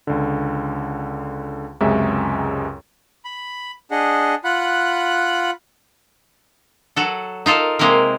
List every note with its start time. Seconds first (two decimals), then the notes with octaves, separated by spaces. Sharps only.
0.07 C#2 D3
1.81 C#2 F#2 C3 G#3 E5
3.25 B5
3.91 D4 G#4 D#5 F#5
4.44 F4 F#5 B5 F#6
6.96 F#3 F#4 A4
7.46 D#4 F4 A4 A#4
7.79 C3 G#3 A#3 C4 A#4